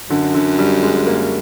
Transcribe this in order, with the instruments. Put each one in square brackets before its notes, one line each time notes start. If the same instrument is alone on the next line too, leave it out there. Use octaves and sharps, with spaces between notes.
[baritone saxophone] F#2 [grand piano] D3
[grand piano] D3
G3
G#3
A#3